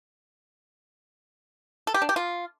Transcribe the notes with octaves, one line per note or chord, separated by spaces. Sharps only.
A4
G4
D4
G4
F4